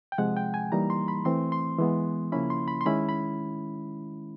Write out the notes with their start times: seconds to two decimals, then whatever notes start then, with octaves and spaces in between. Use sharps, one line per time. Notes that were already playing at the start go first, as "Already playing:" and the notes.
0.12 G5
0.18 C3 F3 G#3 F#5
0.37 G5
0.54 G#5
0.72 E3 G3 A#3 D#4 A#5
0.90 C6
1.08 B5
1.25 E3 A3 C4 C6
1.52 C6
1.79 E3 G#3 B3
2.32 C#3 F3 A#3 C#4 E4 B5
2.50 C6
2.68 B5
2.81 C6
2.86 D#3 G#3 C#4 E4 B5
3.09 B5